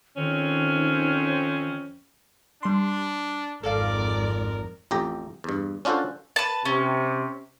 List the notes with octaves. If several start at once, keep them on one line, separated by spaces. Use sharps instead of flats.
F2 D#3 C4 C#4
G3 D4 C6
G#1 F2 A4 A#4 D5 F5
A1 F2 G4 A#5
E2 G2
C#4 D4 F4 F#4 A4 C5
B4 A5
C3 C#4